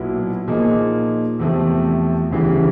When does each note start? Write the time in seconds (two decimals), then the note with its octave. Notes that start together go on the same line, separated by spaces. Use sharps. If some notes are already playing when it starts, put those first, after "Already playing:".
Already playing: B1 A#2 F#3 B3 E4
0.48 A#2 F3 A#3 D#4 G#4
1.39 E2 C3 F3 A3 C4
2.31 D2 C#3 E3 G3